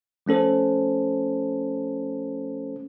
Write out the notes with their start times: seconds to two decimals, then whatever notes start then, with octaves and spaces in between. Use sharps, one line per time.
0.26 F3 A3 C#4 A4 C5